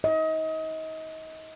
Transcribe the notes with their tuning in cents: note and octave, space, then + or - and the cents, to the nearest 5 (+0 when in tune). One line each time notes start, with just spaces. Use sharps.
D#5 +30